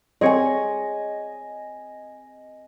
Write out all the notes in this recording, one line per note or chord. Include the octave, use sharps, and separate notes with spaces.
C4 G#4 C#5 D#5 G#5